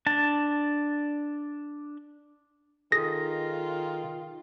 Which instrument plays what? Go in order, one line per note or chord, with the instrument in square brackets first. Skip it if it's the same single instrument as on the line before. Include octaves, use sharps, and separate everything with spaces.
[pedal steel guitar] D4 A5
[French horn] D#3 [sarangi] F4 [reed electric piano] G#4 A4 D#6 [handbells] A#6